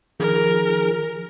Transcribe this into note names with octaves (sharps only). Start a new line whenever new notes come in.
D#3 F3 G#4 A#4